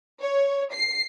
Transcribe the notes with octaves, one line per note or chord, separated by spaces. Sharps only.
C#5
C7